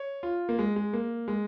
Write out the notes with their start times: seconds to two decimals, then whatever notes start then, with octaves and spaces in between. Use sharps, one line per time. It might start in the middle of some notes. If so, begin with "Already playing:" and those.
Already playing: C#5
0.23 F4
0.49 A#3
0.59 G#3
0.76 G#3
0.93 A#3
1.28 G#3